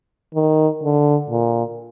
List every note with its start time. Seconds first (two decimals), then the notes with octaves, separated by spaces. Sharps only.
0.35 D#3
0.83 D3
1.30 A#2